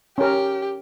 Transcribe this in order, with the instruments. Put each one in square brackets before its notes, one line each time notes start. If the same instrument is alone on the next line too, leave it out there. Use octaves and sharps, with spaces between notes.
[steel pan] C#4 A#4 [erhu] G4